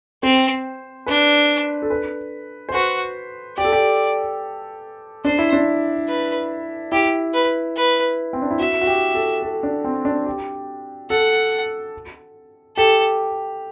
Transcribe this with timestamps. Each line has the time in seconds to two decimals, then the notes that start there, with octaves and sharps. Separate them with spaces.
0.23 C4 C5
1.06 D4 B4
1.82 A4
1.90 B4
2.69 C5
2.74 F#4 B4
3.57 G4 D5
3.65 A4
3.73 G4
5.25 D4 C5
5.39 E4
5.53 D4
6.08 B4
6.92 E4 G4
7.34 B4
7.76 B4
8.33 C4
8.42 D4
8.51 E4
8.59 F#4 E5
8.81 F#4
8.87 G4
9.15 A4
9.43 A4
9.63 D4
9.84 C4
10.05 D4
10.26 G4
11.10 A4 F#5
12.77 G4 A4